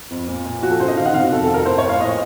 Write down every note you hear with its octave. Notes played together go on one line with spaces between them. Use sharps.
F2
A#2
A#2
F3 F#4
A4
C#3 C5
D#5
D#3 F5
F#5
C3 F5
F#4
F2 A4
A4
F2
A#4
A2 C5
C#5
A2
F5
A#2 D#5